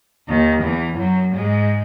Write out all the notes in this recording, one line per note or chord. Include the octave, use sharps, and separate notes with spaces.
D#2 D#3
E2 E3
F#2 F#3
G#2 G#3